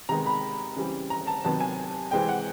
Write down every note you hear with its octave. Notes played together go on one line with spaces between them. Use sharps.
C3 D#3 G#3 B3 A#5
B5
C#3 E3 G3 C4
A#5
A5
C3 D#3 F#3 B3 A5
G#5
C3 E3 G#3 C4 G5
F#5